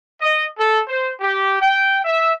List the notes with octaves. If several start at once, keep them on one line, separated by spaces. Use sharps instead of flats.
D#5
A4
C5
G4
G5
E5